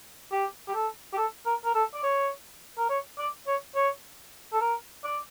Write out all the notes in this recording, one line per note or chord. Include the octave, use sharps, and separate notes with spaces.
G4
G4
A4
G4
A4
A#4
A#4
A4
D5
C#5
A#4
C#5
D5
C#5
C#5
A4
A#4
D5